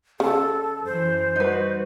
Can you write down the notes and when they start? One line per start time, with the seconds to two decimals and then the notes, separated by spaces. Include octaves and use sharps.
0.20 C#3 A4
0.85 F#2 E3 C5
1.36 G3 D#4 F#4 B4